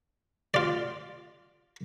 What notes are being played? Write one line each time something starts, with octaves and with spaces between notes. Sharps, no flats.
F4 D5